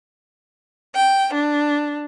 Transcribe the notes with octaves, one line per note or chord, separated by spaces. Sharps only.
G5
D4